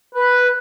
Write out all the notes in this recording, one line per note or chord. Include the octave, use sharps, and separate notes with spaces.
B4